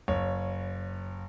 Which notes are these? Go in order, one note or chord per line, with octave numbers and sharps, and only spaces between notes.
F#1 C#5